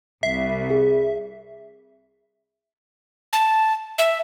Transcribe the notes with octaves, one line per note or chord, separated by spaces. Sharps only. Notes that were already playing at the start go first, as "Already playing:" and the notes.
C2 E5 C7
G#4
A5
E5